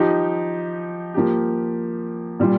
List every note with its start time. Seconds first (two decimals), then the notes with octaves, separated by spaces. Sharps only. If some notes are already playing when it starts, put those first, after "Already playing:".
Already playing: F3 D#4 G4
1.14 F3 A#3 G4
2.40 A#2 G3 A#3 F4